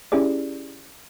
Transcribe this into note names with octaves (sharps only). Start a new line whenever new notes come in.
C#4 E4 G4 G#4 D5